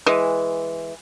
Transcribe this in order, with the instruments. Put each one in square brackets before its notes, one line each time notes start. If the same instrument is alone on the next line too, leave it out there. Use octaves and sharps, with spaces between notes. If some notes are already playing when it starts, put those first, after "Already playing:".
[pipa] E3 G#3